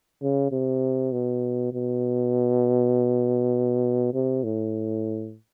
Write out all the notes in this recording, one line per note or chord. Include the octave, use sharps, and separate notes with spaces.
C#3
C3
B2
B2
C3
A2